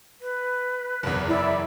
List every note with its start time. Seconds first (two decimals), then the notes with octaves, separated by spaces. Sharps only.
0.21 B4
1.03 F#1 E2
1.28 E4 D5